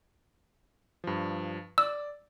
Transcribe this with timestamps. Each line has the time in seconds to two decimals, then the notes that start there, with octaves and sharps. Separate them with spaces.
1.04 G2 F3
1.78 D5 E6